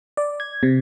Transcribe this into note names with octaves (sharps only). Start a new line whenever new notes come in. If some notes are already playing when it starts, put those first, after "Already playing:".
D5
G#6
C3